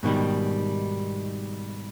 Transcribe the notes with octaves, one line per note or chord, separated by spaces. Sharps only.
G#2 B2 D#3 G3